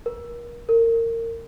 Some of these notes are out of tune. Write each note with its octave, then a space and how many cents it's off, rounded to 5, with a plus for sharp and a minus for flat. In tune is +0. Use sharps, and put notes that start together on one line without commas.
A#4 +35
A#4 -25